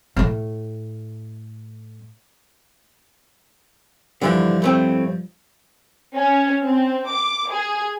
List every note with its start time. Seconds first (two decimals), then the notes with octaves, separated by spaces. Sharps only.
0.16 A2 A3
4.22 G2 D3 E3 F3 E4
4.62 A2 A3 C4
6.14 C#4
6.64 C4
7.09 D6
7.51 G#4